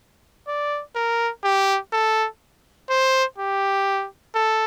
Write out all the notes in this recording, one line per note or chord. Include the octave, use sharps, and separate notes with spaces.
D5
A#4
G4
A4
C5
G4
A4